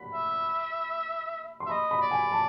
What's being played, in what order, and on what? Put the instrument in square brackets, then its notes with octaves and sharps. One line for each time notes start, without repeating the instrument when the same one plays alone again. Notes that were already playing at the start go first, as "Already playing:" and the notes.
Already playing: [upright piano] B5
[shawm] E5
[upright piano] C6
[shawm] E5
[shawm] D#5 [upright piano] B5
[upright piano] B5
[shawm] D5
[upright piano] G#5
A5